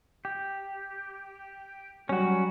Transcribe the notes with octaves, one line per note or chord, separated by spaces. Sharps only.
G4
F#3 G3 C#4 F#4